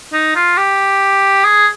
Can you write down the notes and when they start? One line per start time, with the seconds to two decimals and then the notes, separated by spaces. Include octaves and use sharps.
0.13 D#4
0.36 F4
0.57 G4
1.44 G#4